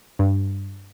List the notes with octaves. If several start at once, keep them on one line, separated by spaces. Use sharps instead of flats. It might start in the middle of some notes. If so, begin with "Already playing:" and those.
G2